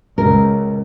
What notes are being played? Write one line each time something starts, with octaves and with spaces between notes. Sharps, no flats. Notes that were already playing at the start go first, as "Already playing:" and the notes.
C#2 A#4